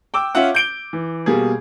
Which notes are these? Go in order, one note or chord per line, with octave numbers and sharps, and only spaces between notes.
G5 D6 E6
C#4 F4 E5 F#5
G6 D7 G7
E3
B2 G3 A#3 G#4